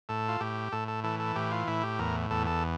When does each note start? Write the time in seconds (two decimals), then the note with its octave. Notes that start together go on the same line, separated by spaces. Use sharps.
0.09 A2 A4
0.29 F4
0.40 A2 G4
0.72 A2 A4
0.88 A4
1.04 E3 A4
1.20 A4
1.36 A2 G4
1.52 F4
1.67 A2 E4
1.83 G4
1.99 E2 A#4
2.31 E2 A4
2.47 A4